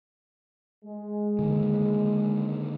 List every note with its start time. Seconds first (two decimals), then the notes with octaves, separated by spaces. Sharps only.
0.85 G#3
1.39 D3 D#3 A#3